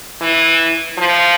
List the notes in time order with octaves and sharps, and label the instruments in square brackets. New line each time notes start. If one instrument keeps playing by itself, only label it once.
[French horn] E3
F3